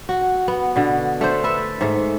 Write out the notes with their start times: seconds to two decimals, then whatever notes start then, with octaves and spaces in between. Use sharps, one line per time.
0.09 F#4
0.48 B3
0.76 B2 D3
1.21 A3 D4 C5
1.44 A4 B4 E5
1.81 G#2 A3